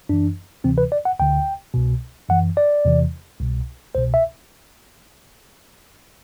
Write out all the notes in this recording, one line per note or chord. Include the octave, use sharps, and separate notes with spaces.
F#2 E3 D4
D2 C3 E3 C4
B4
D5
F#5
D2 D3 G5
C2 B2
F#2 E3 F#5
D5
E2 C3 E3
C2 B2
C2 B2 C5
E5